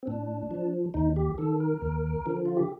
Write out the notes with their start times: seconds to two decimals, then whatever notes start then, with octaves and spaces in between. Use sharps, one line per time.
0.03 C4
0.07 A2 D4
0.51 F3
0.94 D#2 D#4
1.16 G4
1.38 D#3 A4
1.60 A#4
1.82 D#2
2.26 D3 F3
2.45 F4
2.57 G4